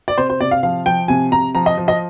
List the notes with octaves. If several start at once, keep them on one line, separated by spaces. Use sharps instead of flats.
D5
C3 C5
C5
C3 D5
F5
F3 F5
F3 G5
C3 G#5
C3 A#5
F3 A#5
D#5
F3
D#5